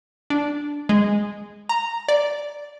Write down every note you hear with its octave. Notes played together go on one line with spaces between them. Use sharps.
D4
G#3
A#5
D5